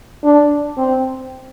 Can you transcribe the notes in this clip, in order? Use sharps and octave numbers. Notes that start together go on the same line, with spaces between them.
D4
C4